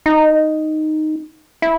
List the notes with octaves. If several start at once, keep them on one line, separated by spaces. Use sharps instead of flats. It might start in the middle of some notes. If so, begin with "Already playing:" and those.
D#4
E4